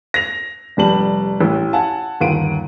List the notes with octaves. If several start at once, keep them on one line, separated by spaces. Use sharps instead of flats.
A#6 F7
F1 G3 A5 F#7
A1
F#5 G#5 A5
G1 D#2 F#5 C6 D7 D#7